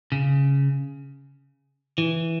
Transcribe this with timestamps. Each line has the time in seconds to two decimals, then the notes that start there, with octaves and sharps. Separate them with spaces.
0.12 C#3
1.98 E3